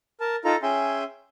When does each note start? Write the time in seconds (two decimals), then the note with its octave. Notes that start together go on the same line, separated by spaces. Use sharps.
0.20 A#4 A5
0.45 D#4 F4 A4 A#5
0.63 C#4 G#4 E5 G5 C6